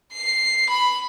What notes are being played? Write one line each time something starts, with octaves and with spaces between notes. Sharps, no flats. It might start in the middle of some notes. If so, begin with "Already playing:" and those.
C7
B5